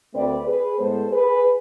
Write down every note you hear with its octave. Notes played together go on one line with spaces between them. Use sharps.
D2 D3 A3 C4 B4 D5
G#4 B4
A2 G#3 B3 A4 C5
G#4 B4